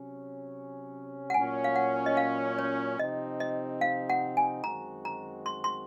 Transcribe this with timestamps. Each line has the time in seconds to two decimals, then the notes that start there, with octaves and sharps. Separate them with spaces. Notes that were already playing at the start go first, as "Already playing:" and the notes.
Already playing: C3 F#3 C#4
1.30 F#5
1.34 A#2 F#3 C#4 G#5
1.64 F5
1.76 F#5
2.06 D#5
2.17 F5
2.59 C#5
2.99 C3 F3 C4 D#4 D#5
3.40 D#5
3.81 F5
4.10 F#5
4.37 G#5
4.64 F#2 D#3 G#3 C4 F#4 A#5
5.05 A#5
5.46 C6
5.64 C6